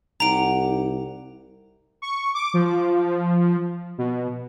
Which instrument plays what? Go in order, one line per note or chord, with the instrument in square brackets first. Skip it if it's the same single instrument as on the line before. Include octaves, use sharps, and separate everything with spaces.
[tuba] C2 [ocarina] D#4 [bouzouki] G4 F#5 [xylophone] A#5 D7
[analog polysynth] C#6
D6
F3
B2